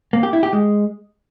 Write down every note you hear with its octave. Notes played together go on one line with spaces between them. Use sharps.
A#3
G4
E4
G4
G#3